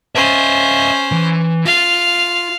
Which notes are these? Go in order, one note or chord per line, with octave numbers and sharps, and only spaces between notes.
C#4 C5 D#5 E5
E3
F4 F5